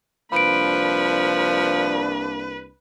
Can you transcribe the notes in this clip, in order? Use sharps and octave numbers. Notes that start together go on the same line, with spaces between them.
C2 F3 A#3 D4 B4 B5 D7